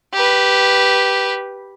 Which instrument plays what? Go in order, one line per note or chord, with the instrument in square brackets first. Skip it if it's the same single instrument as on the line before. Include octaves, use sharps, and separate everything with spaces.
[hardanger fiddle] G4 B4